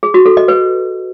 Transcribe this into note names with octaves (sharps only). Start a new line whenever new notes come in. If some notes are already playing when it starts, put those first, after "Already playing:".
G#4
F#4
A4
D#5
B4